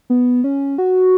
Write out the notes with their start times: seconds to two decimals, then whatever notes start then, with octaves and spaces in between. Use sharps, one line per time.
0.10 B3
0.44 C#4
0.78 F#4